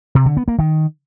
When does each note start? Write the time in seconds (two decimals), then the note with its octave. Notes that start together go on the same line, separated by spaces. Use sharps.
0.15 C3
0.26 D3
0.37 B3
0.48 A#3
0.59 D#3